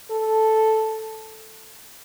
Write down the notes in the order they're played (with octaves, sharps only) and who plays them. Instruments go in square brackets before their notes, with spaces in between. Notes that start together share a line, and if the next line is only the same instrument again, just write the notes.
[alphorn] A4